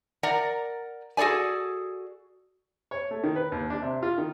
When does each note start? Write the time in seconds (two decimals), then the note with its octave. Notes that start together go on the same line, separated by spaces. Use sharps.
0.23 A#4 D5 F#5 A#5
1.17 F#4 G#4 A4 D5 G#5
2.91 C#5
3.11 A3
3.24 D#3
3.36 B4
3.52 D#2
3.70 D4
3.82 C3
4.03 F4
4.18 D#3